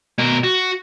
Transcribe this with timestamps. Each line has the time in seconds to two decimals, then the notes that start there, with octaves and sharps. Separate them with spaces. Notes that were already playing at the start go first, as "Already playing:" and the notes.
0.18 B2 A#4
0.44 F#4